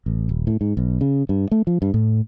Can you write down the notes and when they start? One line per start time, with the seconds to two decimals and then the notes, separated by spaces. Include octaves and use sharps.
0.06 A1
0.29 D#1
0.47 A2
0.61 G#2
0.77 B1
1.01 C#3
1.29 G2
1.52 A3
1.67 F3
1.82 G2
1.94 A2